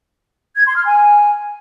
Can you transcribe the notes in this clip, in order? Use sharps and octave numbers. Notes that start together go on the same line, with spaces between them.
G#6
C6
F6
G#5